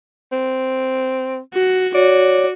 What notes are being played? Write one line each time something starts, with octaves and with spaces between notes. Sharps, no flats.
C4
F#4
F#4 C#5 D5